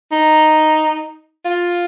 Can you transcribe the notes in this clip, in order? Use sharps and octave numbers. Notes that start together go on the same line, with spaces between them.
D#4
F4